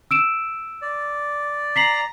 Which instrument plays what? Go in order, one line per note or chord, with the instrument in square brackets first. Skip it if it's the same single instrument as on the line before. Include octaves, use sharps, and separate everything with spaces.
[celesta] E6 D7 E7
[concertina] D5
[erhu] A#5 [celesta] B6 C7 F#7